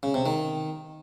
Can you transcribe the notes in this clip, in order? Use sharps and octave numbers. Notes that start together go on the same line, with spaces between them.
C#3
C3
D#3